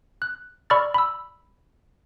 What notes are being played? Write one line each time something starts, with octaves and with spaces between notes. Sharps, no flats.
F#6
D5 B5 C#6 E6 F6 A6
B5 E6